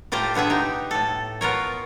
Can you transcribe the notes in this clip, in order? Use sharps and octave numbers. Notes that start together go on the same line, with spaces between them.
A2 F4 G4 C5 A#5
B2 D3 B3 G#4 E5
D#4 G4
A2 A4
B3 F4 A#4 C#5